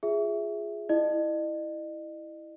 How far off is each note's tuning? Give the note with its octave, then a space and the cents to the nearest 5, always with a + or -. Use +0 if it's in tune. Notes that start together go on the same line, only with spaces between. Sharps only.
F4 +0 G#4 +0 E5 +0
E4 -5 D#5 -40